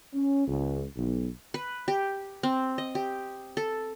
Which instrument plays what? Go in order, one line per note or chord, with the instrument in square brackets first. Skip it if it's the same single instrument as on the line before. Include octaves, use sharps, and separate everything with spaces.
[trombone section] C#4
C#2
B1
[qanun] B4
G4
C4
D#5
G4
A4